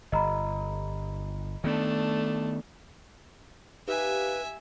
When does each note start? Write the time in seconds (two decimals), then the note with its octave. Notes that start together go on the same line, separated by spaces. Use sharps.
0.12 G1 D#5 A#5 B5
1.64 D#3 A3 B3 D4
3.88 D#4 G4 B4 E5 F5 G#5